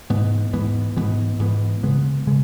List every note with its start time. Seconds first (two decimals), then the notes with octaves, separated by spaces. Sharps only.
0.10 G#2 E3 B3
0.53 G#2 E3 B3
0.97 G#2 E3 B3
1.39 G#2 E3 B3
1.83 C#3 G#3 B3
2.27 C#3 G#3